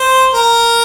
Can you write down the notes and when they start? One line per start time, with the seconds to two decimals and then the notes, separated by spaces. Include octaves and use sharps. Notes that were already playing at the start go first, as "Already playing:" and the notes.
Already playing: C5
0.34 A#4